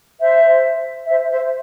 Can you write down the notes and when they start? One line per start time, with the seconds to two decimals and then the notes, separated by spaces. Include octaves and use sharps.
0.19 C5 E5
1.07 C5 E5
1.30 C5 E5